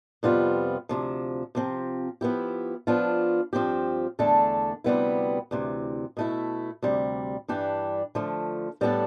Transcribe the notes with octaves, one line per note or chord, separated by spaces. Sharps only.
F2 C3 G3 B3 F4
D2 C3 F3
C3 F3 C4
F3 B3 E4 G4
F3 B3 D4 F4
G2 F3 C4 G4
E2 D3 A3 D4 A4
D2 C3 G3 B3 E4
D2 C3 E3
B2 A3 E4
D2 C3 G3
G2 E3 G3 D4 G4
D3 F3 A3
A2 G3 B3 D4 A4